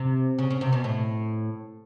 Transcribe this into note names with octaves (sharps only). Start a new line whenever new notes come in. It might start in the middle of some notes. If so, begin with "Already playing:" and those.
Already playing: C3
C#3
C#3
C3
B2
A2